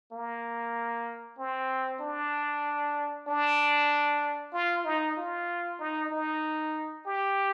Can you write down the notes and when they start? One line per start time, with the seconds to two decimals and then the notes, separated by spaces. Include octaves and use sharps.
0.12 A#3
1.38 C4
2.00 D4
3.28 D4
4.53 F4
4.85 D#4
5.17 F4
5.79 D#4
6.11 D#4
7.06 G4